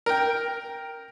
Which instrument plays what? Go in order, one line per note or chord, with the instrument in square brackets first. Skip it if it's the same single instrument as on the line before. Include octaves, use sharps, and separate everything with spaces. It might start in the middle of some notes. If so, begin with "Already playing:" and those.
[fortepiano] A#4 G5